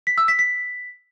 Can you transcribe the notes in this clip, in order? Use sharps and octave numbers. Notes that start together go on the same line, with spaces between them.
B6
E6
B6
B6